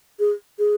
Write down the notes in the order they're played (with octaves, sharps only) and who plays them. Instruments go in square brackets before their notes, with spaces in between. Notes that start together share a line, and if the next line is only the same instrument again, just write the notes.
[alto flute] G#4
G#4